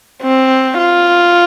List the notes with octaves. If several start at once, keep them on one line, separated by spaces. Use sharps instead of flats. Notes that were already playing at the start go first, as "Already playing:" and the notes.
C4
F4